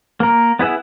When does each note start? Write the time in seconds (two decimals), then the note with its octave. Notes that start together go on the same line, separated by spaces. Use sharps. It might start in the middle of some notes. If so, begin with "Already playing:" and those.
0.20 A#3 A#4
0.59 B3 E4 G#4 E5 F#5